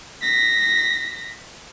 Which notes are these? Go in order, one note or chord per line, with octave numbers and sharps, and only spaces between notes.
A#6 B6